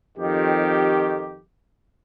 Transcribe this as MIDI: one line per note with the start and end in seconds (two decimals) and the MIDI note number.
0.17 1.39 41
0.17 1.39 51
0.17 1.39 67